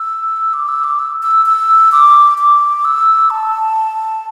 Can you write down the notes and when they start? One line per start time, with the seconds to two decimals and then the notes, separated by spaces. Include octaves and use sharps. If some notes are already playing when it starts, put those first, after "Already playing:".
Already playing: E6
0.53 D6
0.68 E6
0.84 D6
0.99 E6
1.22 E6
1.46 E6
1.92 D6
2.38 D6
2.85 E6
3.30 A5